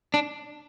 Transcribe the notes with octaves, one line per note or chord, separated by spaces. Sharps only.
D4